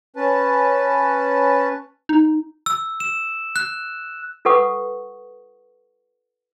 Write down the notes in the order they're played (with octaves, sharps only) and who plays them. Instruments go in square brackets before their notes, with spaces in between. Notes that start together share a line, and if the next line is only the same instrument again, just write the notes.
[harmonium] C#4 B4 A5
[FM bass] D#4
[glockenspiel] E6
E7
F#6
[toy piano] F4 A4 B4 F#5 C#6 D#6